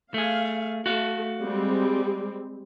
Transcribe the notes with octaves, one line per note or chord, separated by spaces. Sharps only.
A3 G#4 F5
A3 F#4 F5
G3 G#3 C4